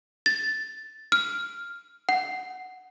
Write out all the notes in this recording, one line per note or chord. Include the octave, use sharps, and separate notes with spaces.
A6
F6
F#5